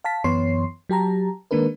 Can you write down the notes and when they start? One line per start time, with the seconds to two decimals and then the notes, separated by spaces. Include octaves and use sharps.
0.04 F5 A5 B6
0.24 F#2 E3 B3 C#5 C6 C7
0.89 F#3 G4 A5 A#5
1.51 D#3 G#3 A#3 D4 A#4 B4